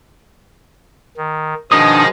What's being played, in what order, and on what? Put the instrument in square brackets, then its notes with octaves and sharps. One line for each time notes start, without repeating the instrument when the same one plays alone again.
[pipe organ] D#3
[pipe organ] B2 D#3 F3 [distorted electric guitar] G#3 [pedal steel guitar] D4 D#4 D#6